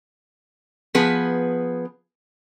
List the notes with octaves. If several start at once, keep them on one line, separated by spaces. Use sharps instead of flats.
F3 B3 G#4 B4